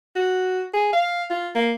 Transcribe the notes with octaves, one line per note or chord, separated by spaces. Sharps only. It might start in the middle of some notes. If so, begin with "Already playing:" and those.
F#4
G#4
F5
F4
A#3